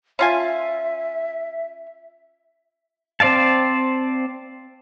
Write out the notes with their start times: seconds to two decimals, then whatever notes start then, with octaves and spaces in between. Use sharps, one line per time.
0.19 C#4 F4 E5 G#5
3.20 C4 C5 D5 F5 A5